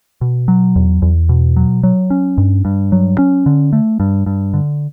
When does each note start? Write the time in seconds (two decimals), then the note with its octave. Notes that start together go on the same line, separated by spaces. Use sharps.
0.21 B2
0.48 F#3
0.76 E2
1.02 E2
1.29 B2
1.56 F#3
1.83 F#3
2.10 C#4
2.38 G2
2.65 G2
2.92 F#3
3.18 C#4
3.46 D3
3.73 A3
4.00 G2
4.26 G2
4.54 D3